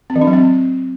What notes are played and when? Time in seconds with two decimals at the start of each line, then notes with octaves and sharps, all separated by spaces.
0.10 C4
0.16 E3
0.21 D4
0.27 F#3
0.33 C4